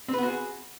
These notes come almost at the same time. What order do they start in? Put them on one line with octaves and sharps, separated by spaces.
C4 B4 B3 F#4 G#4